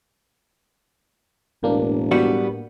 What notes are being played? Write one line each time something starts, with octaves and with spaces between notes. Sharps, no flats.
E1 A2 A#3 D4
G3 B3 F#4